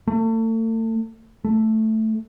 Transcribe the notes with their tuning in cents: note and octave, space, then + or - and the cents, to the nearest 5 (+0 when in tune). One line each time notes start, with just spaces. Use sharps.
A3 +35
A3 +0